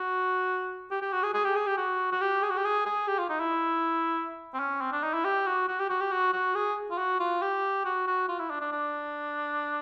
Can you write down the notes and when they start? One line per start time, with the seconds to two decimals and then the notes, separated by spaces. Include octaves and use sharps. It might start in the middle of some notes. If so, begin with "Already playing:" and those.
Already playing: F#4
0.91 G4
1.02 G4
1.13 F#4
1.23 G#4
1.34 G#4
1.44 G4
1.56 G#4
1.67 G4
1.77 F#4
2.12 F#4
2.21 G4
2.43 G#4
2.50 F#4
2.57 G4
2.64 G#4
2.86 G#4
3.08 G4
3.19 F4
3.29 D#4
3.40 E4
4.54 C4
4.60 C#4
4.81 C4
4.92 D4
5.03 D#4
5.14 E4
5.25 G4
5.47 F#4
5.68 F#4
5.79 G4
5.90 F#4
6.01 G4
6.12 F#4
6.33 F#4
6.55 G#4
6.91 F4
6.98 F#4
7.20 F4
7.42 G4
7.85 F#4
8.07 F#4
8.29 F4
8.39 E4
8.50 D4
8.61 D4
8.72 D4